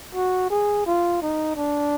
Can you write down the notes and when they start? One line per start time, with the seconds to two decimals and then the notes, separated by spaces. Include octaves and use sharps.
0.15 F#4
0.50 G#4
0.86 F4
1.22 D#4
1.56 D4